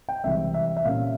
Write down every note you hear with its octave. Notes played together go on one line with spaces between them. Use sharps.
G5
C2 C3 E3 G#3 E5
E5
E5
A#2 G3 A#3 C#4 F5